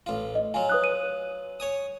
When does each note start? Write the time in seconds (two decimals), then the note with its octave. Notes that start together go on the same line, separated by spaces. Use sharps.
0.06 A1 F4
0.35 D#5
0.54 F#3 F4 G#5
0.69 B4 D#6 F#6
0.84 D#7
1.60 C#5 G#5 D#6